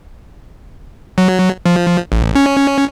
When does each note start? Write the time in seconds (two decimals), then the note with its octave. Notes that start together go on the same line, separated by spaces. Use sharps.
1.18 F#3
1.66 F3
2.12 A1
2.35 C#4